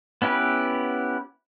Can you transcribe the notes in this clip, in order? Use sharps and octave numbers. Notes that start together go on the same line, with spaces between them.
B3 C#4 E4 G4 B4